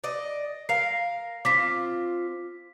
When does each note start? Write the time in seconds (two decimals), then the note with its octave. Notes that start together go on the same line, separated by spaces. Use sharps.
0.04 D5 D#5
0.69 A#4 F5 C7
1.45 C4 F4 D6 B6